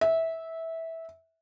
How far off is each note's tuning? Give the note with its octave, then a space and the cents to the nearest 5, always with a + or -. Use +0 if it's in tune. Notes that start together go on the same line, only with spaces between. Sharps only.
E5 -15